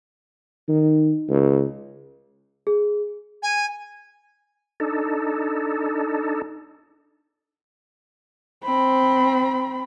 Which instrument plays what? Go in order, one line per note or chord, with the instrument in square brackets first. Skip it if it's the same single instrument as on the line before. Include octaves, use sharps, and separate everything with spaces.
[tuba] D#3
C#2
[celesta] G#4
[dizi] G#5
[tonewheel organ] D4 D#4 A4
[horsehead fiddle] C4 B5